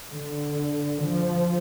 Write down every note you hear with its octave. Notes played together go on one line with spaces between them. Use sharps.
D3
F3